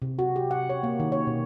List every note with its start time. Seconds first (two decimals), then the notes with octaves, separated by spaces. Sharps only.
0.02 C3
0.19 F#4
0.36 G4
0.51 F#5
0.70 C#5
0.83 A#3
1.00 D#3
1.12 C#5
1.27 B2